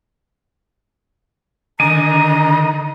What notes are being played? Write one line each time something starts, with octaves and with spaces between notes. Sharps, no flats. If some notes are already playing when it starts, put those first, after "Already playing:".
D3 D#3 D#5 G#5 A#5 D6